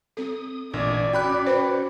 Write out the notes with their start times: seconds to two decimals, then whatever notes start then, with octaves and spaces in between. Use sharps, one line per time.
0.17 C4 A4 D#6
0.74 A1 A#2 D4 D5 G#6
1.13 C#4 F#4 G5 B5 F#6
1.46 B4 C5